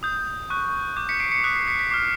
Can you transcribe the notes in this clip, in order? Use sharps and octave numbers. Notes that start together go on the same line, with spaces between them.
D#6 G6
C#6 F#6
D6 G6
B6 C#7
C7 D7
B6 C#7
D#6 F#6 B6
C7
B6 C#7
B6
D6 F6 C7